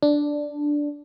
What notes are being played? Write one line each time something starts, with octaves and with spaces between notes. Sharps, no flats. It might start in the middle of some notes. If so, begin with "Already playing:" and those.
D4